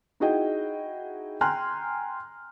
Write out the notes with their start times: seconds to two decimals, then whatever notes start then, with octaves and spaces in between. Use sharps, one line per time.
0.20 D#4 E4 F#4 G#4 D#5 G5
1.41 G5 G#5 A#5 C6 F6 F#6